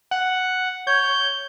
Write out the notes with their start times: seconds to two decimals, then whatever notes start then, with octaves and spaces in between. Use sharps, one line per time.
0.11 F#5
0.87 C#5 G6